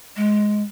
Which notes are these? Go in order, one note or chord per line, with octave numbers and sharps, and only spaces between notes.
G#3